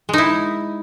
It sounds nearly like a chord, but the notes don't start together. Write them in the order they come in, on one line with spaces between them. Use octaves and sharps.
G#3 D#4 E4